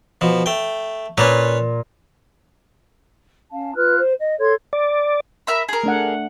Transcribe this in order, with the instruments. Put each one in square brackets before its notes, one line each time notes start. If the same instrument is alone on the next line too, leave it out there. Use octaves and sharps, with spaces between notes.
[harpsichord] B2 F3
A3 G5
[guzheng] A#2 [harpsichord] C#4 B4 C#5
[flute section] C#4 F5 A5
F4 B4 F6 F#6
C5
D#5
A4 C#5 C6 G#6
[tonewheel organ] D5
[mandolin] A#4 E5 B5
G#4 A#4
[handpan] A3 D4 F#5